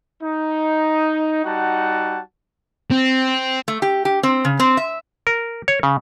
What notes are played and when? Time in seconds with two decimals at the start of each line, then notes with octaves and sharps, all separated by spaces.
0.22 D#4
1.45 G3 D#4 F#4 F#5 A5
2.91 C4
3.68 A3
3.82 G4
4.05 G4
4.23 C4
4.45 C#3
4.60 C4
4.77 E5
5.27 A#4
5.68 C#5
5.83 C#3